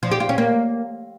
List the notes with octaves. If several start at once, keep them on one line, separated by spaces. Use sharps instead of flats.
F3
G4
F4
C#4
A#3